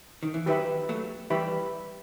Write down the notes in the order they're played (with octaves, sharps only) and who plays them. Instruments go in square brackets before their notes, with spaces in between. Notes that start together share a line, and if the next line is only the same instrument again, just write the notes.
[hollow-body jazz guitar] D#3
E3
[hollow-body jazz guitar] D#3 F#3 [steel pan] G4 B4 E5 B5
[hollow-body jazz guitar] F#3 A3
[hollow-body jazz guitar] E3 G3 [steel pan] G4 B4 E5 B5